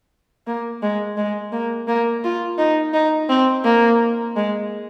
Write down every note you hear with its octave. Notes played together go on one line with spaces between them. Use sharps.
A#3
G#3
G#3
A#3
A#3
F4
D#4
D#4
C4
A#3
G#3